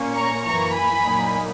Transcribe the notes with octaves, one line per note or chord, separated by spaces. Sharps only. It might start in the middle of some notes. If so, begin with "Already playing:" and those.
Already playing: A#2 A#3 C#4
A#5 C#6
F#2 E3 A#3 A#5 C#6
G#5 B5
A#2 F#3 A#3 D#4